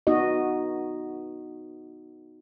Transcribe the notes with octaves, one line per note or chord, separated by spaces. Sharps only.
B3 D#4 F#4 D#5